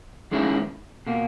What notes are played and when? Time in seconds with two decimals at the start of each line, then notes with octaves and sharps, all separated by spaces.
0.31 E2 D#3 G#3 C#4 E4
1.07 B2 A#3